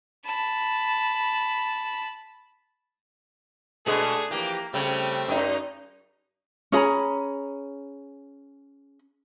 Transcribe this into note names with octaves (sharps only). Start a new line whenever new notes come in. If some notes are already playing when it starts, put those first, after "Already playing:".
A5 B5
B2 G#3 A3 D4 G#4
E3 F3 A#3 G4
C#3 G3 A3 C4
F#2 D#4
C#4 G#4 A#5 B5